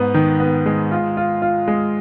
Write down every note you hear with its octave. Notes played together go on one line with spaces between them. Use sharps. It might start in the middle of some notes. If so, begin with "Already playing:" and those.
Already playing: G#2 B3
D#3
B3
G#3
F4
F4
F4
G#3